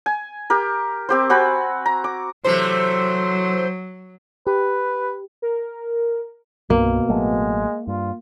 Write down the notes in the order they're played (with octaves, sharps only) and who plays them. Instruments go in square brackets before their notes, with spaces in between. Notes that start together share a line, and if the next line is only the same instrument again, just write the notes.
[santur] G#5
G4 A#4
C4 G4 C5
C4 F#4 G#5 B5
A#5
D6
[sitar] C3 E3 A3 [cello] F#3 [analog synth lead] C5
[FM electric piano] G4 [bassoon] B4
[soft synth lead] A#4
[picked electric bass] C2 G2 [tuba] B2 [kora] A#3
[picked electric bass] A1 F#3 A3 [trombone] G#3
[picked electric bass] G2 [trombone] F4